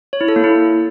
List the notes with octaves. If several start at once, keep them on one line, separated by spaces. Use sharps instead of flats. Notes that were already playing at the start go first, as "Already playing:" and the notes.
C#5
E4
A4
A#3
E4